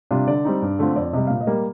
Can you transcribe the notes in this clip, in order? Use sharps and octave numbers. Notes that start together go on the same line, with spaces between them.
C3 G3 D4 F4
D3 D5
G3 C4 D#4
G2
D3 A3 C4 F4
F2 D5
C3 G3 D#5
A#2 F5
D#5
G3 A#3